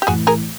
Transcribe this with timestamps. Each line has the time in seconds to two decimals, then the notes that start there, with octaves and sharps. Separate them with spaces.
0.02 G4
0.07 A1 A2 E3 F#4 G#4
0.27 G#4 A#4